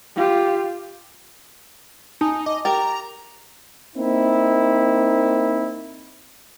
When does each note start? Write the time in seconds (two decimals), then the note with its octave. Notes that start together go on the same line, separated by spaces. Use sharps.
0.16 F4 G4
2.21 D#4 G#5 A5 D#6
2.46 D#5 D6
2.65 G4 A#4 A#5 A6
3.96 A#3 C4 D#4 E4